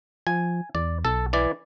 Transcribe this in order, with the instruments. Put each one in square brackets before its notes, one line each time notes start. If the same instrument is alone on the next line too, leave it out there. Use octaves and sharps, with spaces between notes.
[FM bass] F3 [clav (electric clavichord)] G#5
[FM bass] E2 [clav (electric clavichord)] D5
[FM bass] B1 [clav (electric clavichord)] A4
[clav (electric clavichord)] E3 D5